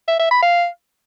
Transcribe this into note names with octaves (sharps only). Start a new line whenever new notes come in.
E5
E5
B5
F5